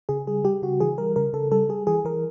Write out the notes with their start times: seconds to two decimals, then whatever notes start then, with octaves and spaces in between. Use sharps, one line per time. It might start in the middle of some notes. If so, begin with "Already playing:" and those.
0.09 C#3 G#4
0.27 G3 G#4
0.44 G3 G4
0.62 C#3 F#4
0.80 E3 G#4
0.98 G3 A#4
1.16 C#3 A#4
1.33 C#3 A4
1.52 G3 A4
1.69 G3 G#4
1.87 E3 G#4
2.05 E3 A#4